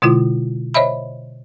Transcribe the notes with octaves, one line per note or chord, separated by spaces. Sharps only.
B2 D3 G#3 E4 F4
C5 C#5 D#5 E5 B5